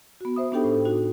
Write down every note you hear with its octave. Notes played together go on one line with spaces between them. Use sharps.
B3 F#4
C5 E5 D#6
B3 D4 D#4 G4 A4 G5
A2
D#4 F#4